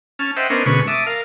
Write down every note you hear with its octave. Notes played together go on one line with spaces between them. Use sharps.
C#4 A5 F6
C5 D#5 E5 F#5 G5
B3 C#4 D4 A#4 C5 D#5
B2 D3 G#3 C#4 B4 C#6
E5 A5 D6 D#6
A#4 F5